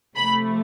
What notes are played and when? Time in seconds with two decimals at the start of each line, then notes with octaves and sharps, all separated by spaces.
0.16 C3 F3 A3 B5